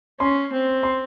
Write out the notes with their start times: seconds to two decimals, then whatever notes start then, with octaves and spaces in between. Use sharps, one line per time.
0.20 C#4 C6
0.52 C4
0.83 C6